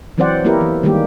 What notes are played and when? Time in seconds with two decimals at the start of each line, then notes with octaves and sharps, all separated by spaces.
0.18 E3 F#3 C4 C5 D5 F#5
0.45 A#3 B3 E4 G4 A#4
0.61 E3
0.83 D#3 G3 G#3 A#3 G4